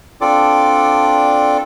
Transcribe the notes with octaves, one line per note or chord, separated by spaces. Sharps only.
C4 D4 F4 A4 D5 D6